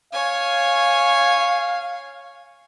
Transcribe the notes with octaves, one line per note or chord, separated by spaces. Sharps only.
C#5 F5 G#5